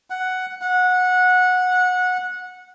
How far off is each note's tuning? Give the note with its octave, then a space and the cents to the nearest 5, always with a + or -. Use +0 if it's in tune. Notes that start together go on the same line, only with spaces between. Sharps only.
F#5 +5
F#5 -20